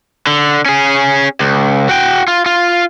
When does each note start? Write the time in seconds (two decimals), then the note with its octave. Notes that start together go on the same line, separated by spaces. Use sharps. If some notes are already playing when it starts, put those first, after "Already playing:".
0.27 D3
0.66 C#4 G#4
1.40 C#2
1.89 F#4 G5
2.28 F4
2.46 F4